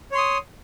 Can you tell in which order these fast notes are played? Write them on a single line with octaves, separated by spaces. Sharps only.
C#5 C6 D#6